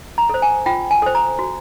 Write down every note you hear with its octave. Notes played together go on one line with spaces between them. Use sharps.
A#5
A4 C5
G#5
F4 G5
G#5
A4 C5
A#5
F#4